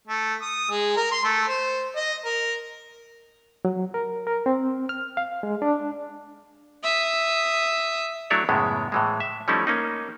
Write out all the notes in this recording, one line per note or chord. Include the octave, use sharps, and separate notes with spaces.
A3
D#6
G#3
A#4
C6
A3
C5
D#5
A#4
F#3
A#4
A#4
C4
F6
F5
G#3
D4
E5 D#6
F#3 A3 D4 E4 C#5 D5
F#2 A2 C#3 G#3 B3
A2 E3 G#3
E5
F3 G3 A3 C#4 D#4 E4
A#3 C#4 D#4